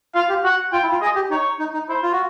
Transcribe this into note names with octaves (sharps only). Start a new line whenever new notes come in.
F4 F5
G4
F#4 F#5
F4 G5
E4
F4
G#4 D#5
G4
D#4 C#5
D#4
D#4
E4 C5
F4
F#4